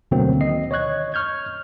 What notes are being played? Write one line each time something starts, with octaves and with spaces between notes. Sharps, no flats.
D2 B2 D3 F#3 A#3 C4
D#3 D#5 C7
C#5 D#5 C#6 F#6 G#6
C#6 F6 G6 G#6